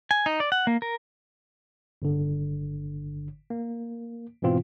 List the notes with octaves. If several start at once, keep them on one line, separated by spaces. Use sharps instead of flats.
G#5
D#4
D5
F#5
A#3
A#4
G1 D3
A#3
G#2 B2 E3 C4 F4